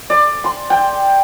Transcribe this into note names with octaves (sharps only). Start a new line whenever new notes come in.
D5
C6
G5